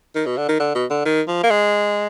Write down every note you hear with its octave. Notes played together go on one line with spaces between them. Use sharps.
D#3
B2
D3
D#3
D3
B2
D3
D#3
F3
A#3
G#3